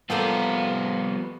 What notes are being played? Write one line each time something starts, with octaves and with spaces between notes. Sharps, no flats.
F3 G3 A#3 B3 F4 G4 A4